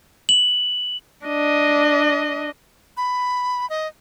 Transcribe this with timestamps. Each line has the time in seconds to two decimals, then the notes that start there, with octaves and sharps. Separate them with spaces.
0.29 F#7
1.26 D4 D#5
2.97 B5
3.70 D#5